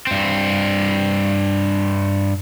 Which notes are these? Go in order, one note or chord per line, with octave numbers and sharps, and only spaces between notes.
G2 C4